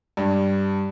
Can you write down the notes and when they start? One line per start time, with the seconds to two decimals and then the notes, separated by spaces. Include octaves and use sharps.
0.17 G2